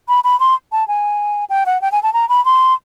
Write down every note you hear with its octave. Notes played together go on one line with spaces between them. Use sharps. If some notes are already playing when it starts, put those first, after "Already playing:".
B5
B5
C6
A5
G#5
G5
F#5
G5
G#5
A5
A#5
B5
C6